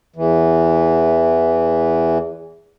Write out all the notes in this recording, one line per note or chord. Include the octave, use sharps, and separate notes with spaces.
E2 E3